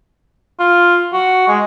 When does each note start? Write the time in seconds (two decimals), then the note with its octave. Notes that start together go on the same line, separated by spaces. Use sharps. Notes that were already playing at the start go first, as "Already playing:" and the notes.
0.60 F4
1.13 F#4
1.48 G#3